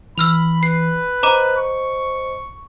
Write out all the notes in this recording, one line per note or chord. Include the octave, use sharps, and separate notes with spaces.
E3 B5 E6 F6 F7
B4 C7
C5 D#5 A#5 D6 D#7
C#6